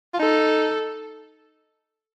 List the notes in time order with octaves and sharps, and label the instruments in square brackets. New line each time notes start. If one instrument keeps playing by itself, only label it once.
[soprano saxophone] F4
[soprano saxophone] D#4 [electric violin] A4